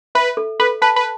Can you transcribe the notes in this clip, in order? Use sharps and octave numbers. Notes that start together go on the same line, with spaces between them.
B4 E5
A4
A4 B4
B4 A5
B4